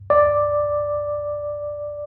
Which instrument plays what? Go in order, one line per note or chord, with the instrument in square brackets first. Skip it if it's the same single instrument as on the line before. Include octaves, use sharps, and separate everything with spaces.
[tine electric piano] D5